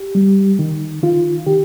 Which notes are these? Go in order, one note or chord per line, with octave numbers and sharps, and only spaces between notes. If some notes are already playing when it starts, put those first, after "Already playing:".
Already playing: G4
G3
D#3
D#3 F4
D#3 G4